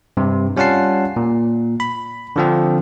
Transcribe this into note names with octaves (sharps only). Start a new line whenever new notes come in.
G2 C3
G3 C#4 F4 F#5 A5 C7
A#2
B5
D3 F3 C4